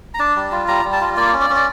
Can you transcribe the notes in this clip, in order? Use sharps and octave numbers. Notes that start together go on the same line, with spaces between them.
A#5
D4 A5
G3
F4
G3 A#5
G3
A5
F4
A#3 D5
C#4
D5
C#4
D5